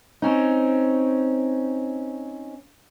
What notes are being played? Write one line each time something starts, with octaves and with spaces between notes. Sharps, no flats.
C4 C#4 D#4